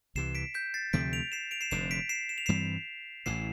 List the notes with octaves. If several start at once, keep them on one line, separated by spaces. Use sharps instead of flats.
C2 C3 E3 C7 E7
B6 D7
G6 B6
A6 C7
D2 C3 F3 A3 B6 D7
D7 F7
C7 E7
D7 F7
C7 E7
F1 F2 D3 C7 E7
B6 D7
C7 E7
E7
F7
G2 E3 G3 C4 C7 E7
A1 A2 E3 C7 E7